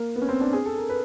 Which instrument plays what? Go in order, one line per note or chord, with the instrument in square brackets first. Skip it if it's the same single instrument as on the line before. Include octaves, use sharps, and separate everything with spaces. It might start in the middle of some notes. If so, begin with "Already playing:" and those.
Already playing: [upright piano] A#3
B3
C#4
C4
D4
G#4
A4
A#4
B4